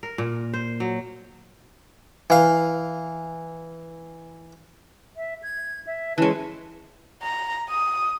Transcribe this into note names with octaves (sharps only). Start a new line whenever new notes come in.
A#4
A#2
C5
F#3
E3 F5
E5
G#6
E5
E3 G#3 C#4 B4 A5
A#5
D#6